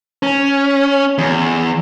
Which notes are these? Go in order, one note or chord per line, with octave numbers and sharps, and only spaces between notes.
C#4
E2